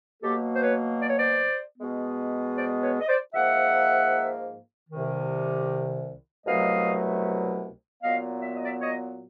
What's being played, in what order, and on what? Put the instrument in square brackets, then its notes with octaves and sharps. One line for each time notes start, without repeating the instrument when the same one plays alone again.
[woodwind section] B2 F#3 A#3 G4 A4
C5
B4 C#5
D5
C#5
C5 D5
B2 G#3 B3
C5 D5
B4 C#5
D#5
C5 D5
G#2 F3 A#3 E5 F#5
C2 C3 D#3
C2 B2 F#3 A3 D#5 F5
A#2 F#3 B3 D#5 F5
E5
D#5
D5 E5
C#5 D#5